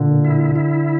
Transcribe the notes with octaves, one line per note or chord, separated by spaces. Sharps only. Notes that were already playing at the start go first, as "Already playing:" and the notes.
Already playing: A#2 D3
E4
E4